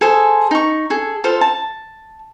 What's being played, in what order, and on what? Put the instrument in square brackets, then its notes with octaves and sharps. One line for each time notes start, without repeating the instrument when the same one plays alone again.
[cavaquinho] G#4 A4 C5 G#5
D#4 C#6
G#4 A4
F4 A4 C5 F5
A5